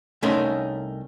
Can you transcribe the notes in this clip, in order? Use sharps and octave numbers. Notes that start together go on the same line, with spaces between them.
C2 A3 C#4 D#4 A#4 C6